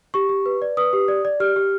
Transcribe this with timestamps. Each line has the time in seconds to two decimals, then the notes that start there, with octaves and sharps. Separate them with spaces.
0.14 G4 C#6
0.29 G4
0.46 B4
0.62 D5
0.77 B4 D#6
0.93 G4
1.08 D5
1.25 D5
1.40 G4 F6
1.56 G4